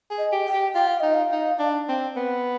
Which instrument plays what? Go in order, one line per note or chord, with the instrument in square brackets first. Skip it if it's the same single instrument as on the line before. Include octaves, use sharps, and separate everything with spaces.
[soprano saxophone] G#4
[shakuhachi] D#5
[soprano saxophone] G4
[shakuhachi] G5
[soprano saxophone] G4
[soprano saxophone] F4 [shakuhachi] G5
[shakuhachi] F5
[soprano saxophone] D#4 [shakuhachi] D#5
[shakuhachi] F5
[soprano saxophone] D#4
D4
C4
B3